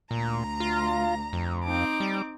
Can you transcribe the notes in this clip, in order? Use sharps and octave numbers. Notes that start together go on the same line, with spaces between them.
D2 A#2 A#5
F4
F2
C4 D#4 D6
G3